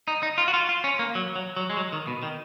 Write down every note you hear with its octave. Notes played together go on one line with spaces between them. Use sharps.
D#4
D#4
F4
F#4
F4
F4
C#4
A#3
F#3
F#3
F#3
G#3
F#3
D#3
B2
D#3